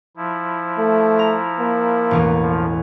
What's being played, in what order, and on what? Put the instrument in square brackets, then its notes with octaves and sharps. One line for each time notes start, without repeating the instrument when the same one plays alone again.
[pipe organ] F3 E4
[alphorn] A3
[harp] A#5
[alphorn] A#3
[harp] E1 A1 E2
[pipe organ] F3